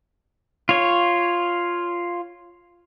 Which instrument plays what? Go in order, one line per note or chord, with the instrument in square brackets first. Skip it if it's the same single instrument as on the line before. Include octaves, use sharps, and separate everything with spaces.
[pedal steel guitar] F4 C#5